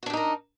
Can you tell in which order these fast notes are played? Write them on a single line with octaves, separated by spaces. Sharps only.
F#4 D4 G4 D#4 A#4